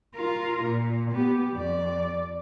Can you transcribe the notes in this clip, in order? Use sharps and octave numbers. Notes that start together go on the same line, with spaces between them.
F4 A#4
A#2
B3 G4
F2 D5